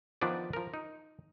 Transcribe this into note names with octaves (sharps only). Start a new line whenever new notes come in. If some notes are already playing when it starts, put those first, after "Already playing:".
D#3 F3 B3 D4 D5
F3 A#4
D#4